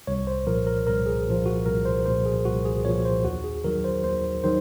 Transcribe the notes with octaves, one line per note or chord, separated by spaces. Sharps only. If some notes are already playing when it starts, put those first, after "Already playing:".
C2 C#5
C5
A#2 F3 A#4
A#4
C2 A#4
G#4
A#2 F3
F#4
C2 A#4
C5
A#2 F3 C5
G#4
C2 F#4
G#4
A#2 F3 C#5
C5
D#2 F#4
G#4
D#3 F#3 A#4
C5
D#2 C5
D#3 F#3 C5